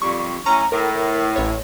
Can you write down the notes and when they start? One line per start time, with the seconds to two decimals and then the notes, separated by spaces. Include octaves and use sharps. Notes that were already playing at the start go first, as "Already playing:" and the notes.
0.02 F2 G3 C#6
0.46 A2 C#4 A#5
0.72 A2 A#4
1.36 A1 C#5